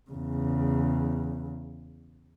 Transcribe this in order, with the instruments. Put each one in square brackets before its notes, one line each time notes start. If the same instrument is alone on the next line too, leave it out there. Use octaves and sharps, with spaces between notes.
[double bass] E2 C#3